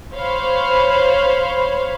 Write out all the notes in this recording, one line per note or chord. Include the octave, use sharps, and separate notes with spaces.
C5 C#5 F5 B5